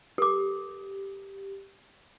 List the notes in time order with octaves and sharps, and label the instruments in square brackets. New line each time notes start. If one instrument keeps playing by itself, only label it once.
[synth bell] G4 [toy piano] A4 D6